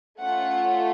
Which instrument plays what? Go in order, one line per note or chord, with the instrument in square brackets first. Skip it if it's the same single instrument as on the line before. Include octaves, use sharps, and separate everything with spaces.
[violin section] A3 C#4 F4 F#5